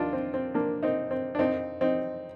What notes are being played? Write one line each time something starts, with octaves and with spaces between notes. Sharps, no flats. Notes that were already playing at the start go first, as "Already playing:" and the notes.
Already playing: D#2 D4 D#4 F4
C4
C4
A#3 D4
C4 D#4
C4
D4
F2 D#3 C4 D#4
C4 D#4